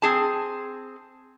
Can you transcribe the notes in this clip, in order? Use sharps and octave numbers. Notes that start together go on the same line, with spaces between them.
C4 G#4 A5